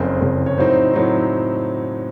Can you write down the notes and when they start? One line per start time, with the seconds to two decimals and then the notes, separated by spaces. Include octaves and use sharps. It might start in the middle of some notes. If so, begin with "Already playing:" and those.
Already playing: F#1 F2 C#3 C5
0.21 F#1 F2 C#3
0.46 C#5
0.58 A2 F#3 C4 D#4 C5
0.93 A2 F#3 C4 D#4